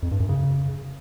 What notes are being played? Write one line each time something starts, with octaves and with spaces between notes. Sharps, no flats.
F2
G2
F#2
C#3